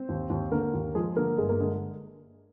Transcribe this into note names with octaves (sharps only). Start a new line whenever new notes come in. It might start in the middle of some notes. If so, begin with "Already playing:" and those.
Already playing: C4 C5
D#2
D#2
D3 A#3 A#4
D#2
F3 G#3 G#4
D3 A#3 A#4
G1 G#3 G#4
A#3 A#4
D3 G#3 G#4